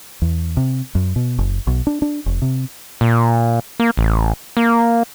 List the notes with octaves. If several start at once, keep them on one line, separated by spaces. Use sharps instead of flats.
E2
C3
F#2
B2
F#1
B1
D4
D4
F1
C3
A#2
A#3
A1
A#3